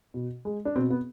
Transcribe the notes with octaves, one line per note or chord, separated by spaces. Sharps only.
B2
G#3
D4
B2 C4
B3